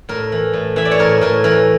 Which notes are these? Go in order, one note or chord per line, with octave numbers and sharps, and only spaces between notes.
A2 A#4
E3
A2
E3 E5
D5
C#5
A2 A#4
A2 A#4
E3 A#4